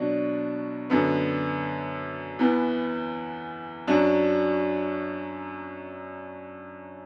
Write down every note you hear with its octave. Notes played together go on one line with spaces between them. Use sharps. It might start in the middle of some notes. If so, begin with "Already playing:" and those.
Already playing: B2 F#3 D4 F#4
F#2 D3 B3
E2 E3 B3
F#2 F#3 D4 F#4